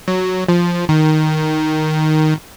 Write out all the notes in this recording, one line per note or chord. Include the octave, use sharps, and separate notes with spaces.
F#3
F3
D#3